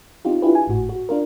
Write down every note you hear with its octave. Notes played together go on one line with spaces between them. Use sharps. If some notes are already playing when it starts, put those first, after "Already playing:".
C4 D#4 F4 G4
D4 E4 F4 G4 G#4 B4
G#5
G#1 A2 F#4
F#4
D4 F4 A#4